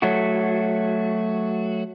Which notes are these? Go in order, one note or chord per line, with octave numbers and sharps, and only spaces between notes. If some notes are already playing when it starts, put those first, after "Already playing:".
F#3 A3 F#4